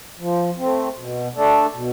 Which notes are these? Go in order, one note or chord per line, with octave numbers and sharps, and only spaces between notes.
F3
A3 C4
B2
A3 D4 A4
B2